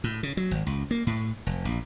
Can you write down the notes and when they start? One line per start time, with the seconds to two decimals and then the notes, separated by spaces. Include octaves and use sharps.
0.04 A2
0.23 C#3
0.37 F#3
0.51 G#1
0.66 C#2
0.91 A#3
1.07 A2
1.47 F1
1.65 A#1